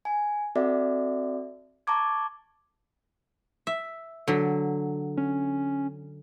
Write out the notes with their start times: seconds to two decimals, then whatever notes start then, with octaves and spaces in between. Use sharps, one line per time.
0.05 G#5
0.55 C4 F#4 A4 D5 E5
1.87 A5 A#5 C#6 D6 G#6
3.67 E5
4.28 D3 F#3
5.18 C#4